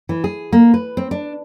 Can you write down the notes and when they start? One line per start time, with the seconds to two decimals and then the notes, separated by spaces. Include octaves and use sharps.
0.09 E3
0.24 G#4
0.53 A#3
0.74 B4
0.97 C4
1.11 D4